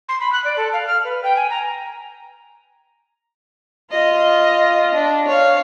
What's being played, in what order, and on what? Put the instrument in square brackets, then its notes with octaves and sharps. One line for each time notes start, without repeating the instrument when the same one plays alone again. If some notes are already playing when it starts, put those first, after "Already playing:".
[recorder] C6
B5
F#6
D5
A4
F5
F6
B4
G5
G#5
A#5
[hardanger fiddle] F4 D#5
D4
C#5 F5